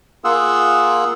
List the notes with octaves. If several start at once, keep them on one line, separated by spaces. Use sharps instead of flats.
A#3 F4 G#4 F#5 E6